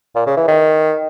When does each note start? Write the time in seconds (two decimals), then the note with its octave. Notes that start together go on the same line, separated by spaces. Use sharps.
0.16 A#2
0.26 C#3
0.37 E3
0.48 D#3